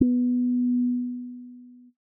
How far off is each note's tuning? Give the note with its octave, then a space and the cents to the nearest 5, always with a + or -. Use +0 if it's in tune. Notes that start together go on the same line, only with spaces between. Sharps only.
B3 +0